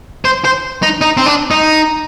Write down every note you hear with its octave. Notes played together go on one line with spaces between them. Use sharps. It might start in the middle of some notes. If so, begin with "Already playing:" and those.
C5
C5
D#4
D#4
C4
D4
D#4